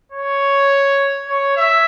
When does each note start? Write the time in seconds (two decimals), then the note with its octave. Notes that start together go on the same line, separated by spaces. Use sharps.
0.12 C#5
1.27 C#5
1.57 E5